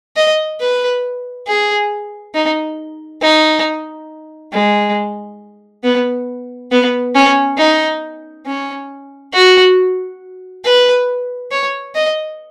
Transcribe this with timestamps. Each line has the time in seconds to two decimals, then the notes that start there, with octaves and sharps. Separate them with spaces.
0.16 D#5
0.60 B4
1.47 G#4
2.35 D#4
3.22 D#4
4.53 G#3
5.84 B3
6.71 B3
7.15 C#4
7.58 D#4
8.46 C#4
9.33 F#4
10.65 B4
11.52 C#5
11.95 D#5